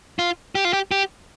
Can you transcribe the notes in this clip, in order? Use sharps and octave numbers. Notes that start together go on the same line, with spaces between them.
F4
G4
F4
G4
G4